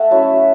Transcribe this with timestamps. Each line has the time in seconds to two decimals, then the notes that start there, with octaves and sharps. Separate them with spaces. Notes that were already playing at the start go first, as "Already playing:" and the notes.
Already playing: A3 E5 F#5 A5
0.11 F#3 C#4 E4